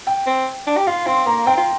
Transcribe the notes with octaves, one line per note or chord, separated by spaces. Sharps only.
G5
C4
D4
G4
F4 F5
C4 C6
A#3 A#5
C4 G5
F4